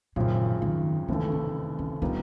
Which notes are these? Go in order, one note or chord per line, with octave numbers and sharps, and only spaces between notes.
G#1 F#2 A#2 C#3 F3
D#3
F1 D#2 C#3 E3 G#3 A3
C4
C#4
A#2 G3 B3 C4 D#4